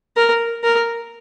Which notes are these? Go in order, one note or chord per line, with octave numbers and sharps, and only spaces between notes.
A#4
A#4